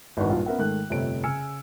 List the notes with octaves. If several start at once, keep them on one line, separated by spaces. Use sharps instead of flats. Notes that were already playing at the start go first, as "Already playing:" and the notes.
G#1 E2 D4 F#4 B4 C#6
A#1 G2 F4 F#4
B3 C#4 A#4 E5 F#5
G#2 D#3 A3 F#6
G1 F2 C3 A3 C#5 D7
C#3 G#5 E6 F6 C#7